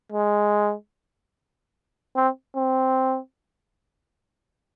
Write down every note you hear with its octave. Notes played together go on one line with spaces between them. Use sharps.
G#3
C4
C4